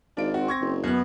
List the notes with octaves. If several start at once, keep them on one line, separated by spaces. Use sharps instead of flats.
G#1 D4 F4 D7
C4 F#4
C#6 G#6 A#6
F#1
F#2 B3 F#6